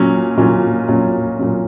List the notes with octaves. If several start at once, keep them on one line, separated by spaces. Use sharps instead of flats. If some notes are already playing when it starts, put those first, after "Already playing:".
Already playing: A#2 F#3 C#4
A#2 F#3 C#4
A#2 F#3 C#4
A#2 F#3 C#4